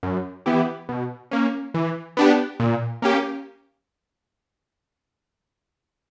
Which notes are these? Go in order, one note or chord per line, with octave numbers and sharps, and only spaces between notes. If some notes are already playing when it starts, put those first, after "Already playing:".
F#2
E3 B3 E4 G4
B2
A#3 C#4
E3
B3 D4 G4
A#2
A#3 C#4 G4